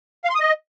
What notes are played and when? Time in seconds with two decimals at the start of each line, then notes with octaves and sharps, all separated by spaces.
0.24 F5
0.30 C6
0.35 D#6
0.40 D#5